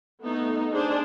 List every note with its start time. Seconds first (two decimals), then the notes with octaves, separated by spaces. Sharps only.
0.20 A3 B3 D#4
0.72 D4 G#4 C5